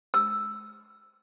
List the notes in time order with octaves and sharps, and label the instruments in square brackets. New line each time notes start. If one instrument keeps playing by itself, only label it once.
[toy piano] E6